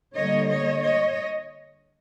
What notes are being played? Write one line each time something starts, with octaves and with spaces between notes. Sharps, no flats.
D3 G3 A#3 C#5 D#5
C#5 D#5
C#5 D#5